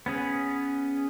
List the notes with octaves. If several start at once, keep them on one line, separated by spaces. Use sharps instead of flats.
B3 C#4 G#4